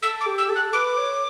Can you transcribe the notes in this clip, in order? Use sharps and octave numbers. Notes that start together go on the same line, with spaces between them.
A4 E6
D6
G4
E6
A4
F#6
B4 D6
C#5